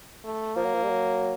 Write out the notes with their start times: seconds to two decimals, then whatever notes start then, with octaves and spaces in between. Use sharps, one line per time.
0.24 A3
0.56 F3 A#3
0.65 F#3
0.75 F3
0.83 G3
0.89 F#3